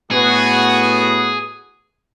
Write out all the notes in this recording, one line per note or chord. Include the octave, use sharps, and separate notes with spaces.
A2 B3 F#4 G#4